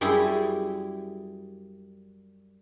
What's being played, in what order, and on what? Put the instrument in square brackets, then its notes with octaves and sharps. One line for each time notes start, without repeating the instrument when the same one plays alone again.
[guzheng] F#2 G3 E4 G#4 C6